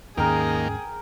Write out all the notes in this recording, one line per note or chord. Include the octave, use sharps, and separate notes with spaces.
D#2 G#2 D#3 A#3 C#4 G#4 A#4 G5